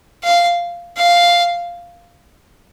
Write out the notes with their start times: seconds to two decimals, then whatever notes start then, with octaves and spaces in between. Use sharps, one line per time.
0.24 F5
0.97 F5